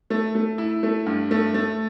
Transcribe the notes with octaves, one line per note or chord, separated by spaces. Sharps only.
A3
A3
E4
A3
G2
A3
A3